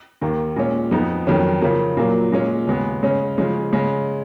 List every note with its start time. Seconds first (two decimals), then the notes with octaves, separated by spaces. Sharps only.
0.21 D#2 D#3 A#3
0.56 A#2 G#3 C#4
0.91 F2 F3 B3 D#4
1.27 F2 D#3 F#3 C#4
1.61 C#3 F3 A#3
1.97 A#2 F#3 A#3
2.32 A#2 G#3 C#4
2.67 D#2 C#3 G#3 B3
3.03 C#3 G#3 C#4
3.37 C#3 F3 G#3 C#4
3.73 C#3 G#3 C#4